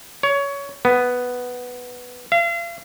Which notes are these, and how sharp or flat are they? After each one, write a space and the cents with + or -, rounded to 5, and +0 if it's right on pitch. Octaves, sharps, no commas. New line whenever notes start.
C#5 +20
B3 +0
F5 -40